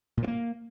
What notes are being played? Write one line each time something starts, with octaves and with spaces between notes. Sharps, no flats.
A#2
F3
A#3